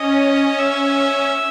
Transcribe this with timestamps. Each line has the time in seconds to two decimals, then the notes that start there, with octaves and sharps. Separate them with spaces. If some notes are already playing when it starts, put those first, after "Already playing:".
Already playing: C#4 D#5
0.59 E5